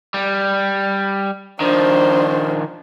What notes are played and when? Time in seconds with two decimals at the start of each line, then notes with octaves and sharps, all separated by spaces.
0.14 G3
1.60 D#3 F3 D4 C5